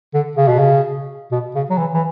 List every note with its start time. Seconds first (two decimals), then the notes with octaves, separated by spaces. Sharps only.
0.14 D3
0.37 C#3
0.48 B2
0.59 C#3
1.31 B2
1.55 C#3
1.70 F#3
1.78 E3
1.94 E3